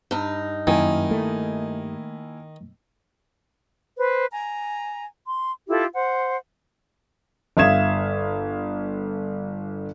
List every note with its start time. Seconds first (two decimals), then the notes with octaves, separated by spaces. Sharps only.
0.11 G2 D#4
0.67 F#2 D#3 A#3 E4 G#5
1.11 A3
3.96 B4 C5
4.32 G#5 A#5
5.25 C6
5.68 E4 F4 G4 A4
5.94 C5 F#5
7.57 G1 E5 F5 D#6 G#6 E7